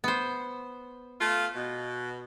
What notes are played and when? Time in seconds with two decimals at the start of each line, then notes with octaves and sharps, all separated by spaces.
0.04 B3 C5
1.20 A3 F4
1.56 B2